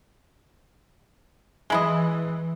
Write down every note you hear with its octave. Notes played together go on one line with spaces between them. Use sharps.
E3 G#3 E4 D#5